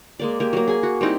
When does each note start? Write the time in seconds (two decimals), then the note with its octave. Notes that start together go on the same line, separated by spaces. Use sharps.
0.19 G#3 A#3 D5
0.40 A#3 G4
0.53 F#3 A#3
0.68 G#4 G#5
0.83 F#4
1.01 G3 C4 D#4 E4